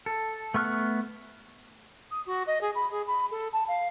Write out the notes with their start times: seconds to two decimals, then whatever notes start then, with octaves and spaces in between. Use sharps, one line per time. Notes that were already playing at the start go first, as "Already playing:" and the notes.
0.06 A4
0.54 A3 B3 C#6 F6 F#6
2.11 D#6
2.26 F#4
2.47 D#5
2.61 G#4
2.75 B5
2.91 G#4
3.07 B5
3.31 A4
3.53 A5
3.68 F5